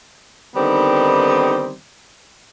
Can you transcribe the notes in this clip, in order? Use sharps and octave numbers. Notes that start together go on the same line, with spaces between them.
D3 D#3 G3 B3 C4 D#4